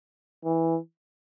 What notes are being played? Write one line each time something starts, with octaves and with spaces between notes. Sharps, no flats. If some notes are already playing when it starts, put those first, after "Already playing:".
E3